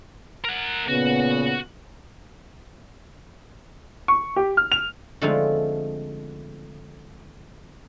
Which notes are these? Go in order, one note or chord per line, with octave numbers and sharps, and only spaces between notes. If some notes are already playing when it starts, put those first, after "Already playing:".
A#4 F#5
A#2 C#3 B3 F#4
C#6
G4
F6
F7
D3 F3 G#3 A3 C4 D#4